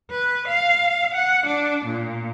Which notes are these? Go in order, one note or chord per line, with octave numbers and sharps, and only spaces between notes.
B4
F5
F#5
D4
A#2